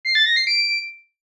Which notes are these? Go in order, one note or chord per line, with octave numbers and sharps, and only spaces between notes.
C7
A6
A#6
C7
D7